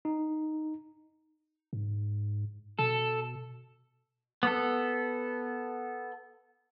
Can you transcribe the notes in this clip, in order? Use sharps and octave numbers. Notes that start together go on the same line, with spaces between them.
D#4
G#2
B2 A4
B3 A4